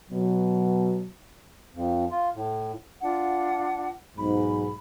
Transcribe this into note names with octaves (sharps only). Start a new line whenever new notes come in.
B2 F#3
F2
F4
A2
D4 F4 F#5
B1 G#2 B5